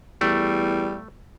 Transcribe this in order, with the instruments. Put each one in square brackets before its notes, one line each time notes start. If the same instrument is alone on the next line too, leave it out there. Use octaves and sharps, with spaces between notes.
[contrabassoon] E2 [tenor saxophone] G3 [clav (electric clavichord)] A3